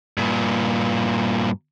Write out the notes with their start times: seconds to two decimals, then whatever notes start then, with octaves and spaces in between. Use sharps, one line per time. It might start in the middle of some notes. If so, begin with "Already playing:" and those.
0.17 G2 A#2